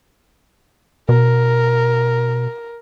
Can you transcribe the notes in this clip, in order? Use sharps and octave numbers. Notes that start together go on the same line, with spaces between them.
B2 A#4